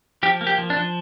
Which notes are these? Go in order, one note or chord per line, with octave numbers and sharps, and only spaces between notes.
F3 G4
A#3
G4
F3
D4
F3